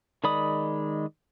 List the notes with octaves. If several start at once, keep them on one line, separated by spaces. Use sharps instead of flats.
D#3 G#3 D5 B5 D#6